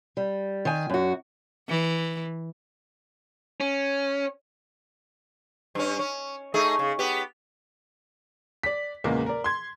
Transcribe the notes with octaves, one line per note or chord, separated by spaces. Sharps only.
G3
D#3 G#5
F#2 F#4
E3
C#4
G2 C#4
C#4
A3 D#4 G#4
C#3
B3 G4
D5 B6
E2 A#2 C#3 G#3 A#3
A#4 D5
C6 G#6